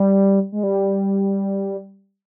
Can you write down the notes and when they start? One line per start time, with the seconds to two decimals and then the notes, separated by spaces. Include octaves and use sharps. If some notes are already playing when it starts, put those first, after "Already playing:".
Already playing: G3
0.52 G#3
0.63 G3